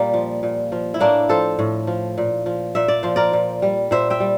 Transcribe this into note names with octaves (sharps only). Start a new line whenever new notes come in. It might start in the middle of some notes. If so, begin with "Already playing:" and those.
Already playing: A#2 G3 A#3
F3
A#2
F3
E4
A2 A#3 D4
F3 A4 C5
A2
F3
A#2
F3
A#2 E5
D5
F3 C5
A#4 D5
A#2
G3
A#2 C5 E5
E5 G5
G3